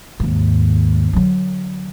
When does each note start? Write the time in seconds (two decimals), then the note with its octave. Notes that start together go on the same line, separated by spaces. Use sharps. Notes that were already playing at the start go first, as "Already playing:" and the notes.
0.20 D#2 G#2
1.13 D3 F#3